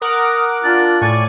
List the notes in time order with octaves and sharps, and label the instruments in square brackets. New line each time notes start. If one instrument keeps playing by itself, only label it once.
[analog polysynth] A#4 F#5 D6 [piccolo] D#6
[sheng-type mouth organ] D4 F#6 [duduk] F4 [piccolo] A6
[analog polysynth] A2 [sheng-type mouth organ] D5 G#5 C#6